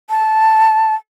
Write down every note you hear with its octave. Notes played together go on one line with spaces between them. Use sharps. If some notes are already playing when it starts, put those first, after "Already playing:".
A5